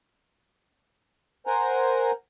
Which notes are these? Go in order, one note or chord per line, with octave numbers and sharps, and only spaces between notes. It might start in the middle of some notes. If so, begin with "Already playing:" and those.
A#4 C5 F#5 G#5 A#5